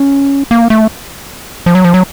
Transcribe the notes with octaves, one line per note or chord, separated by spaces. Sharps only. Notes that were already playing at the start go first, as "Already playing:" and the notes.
Already playing: C#4
A#3
A3
F3
F#3
F3
F#3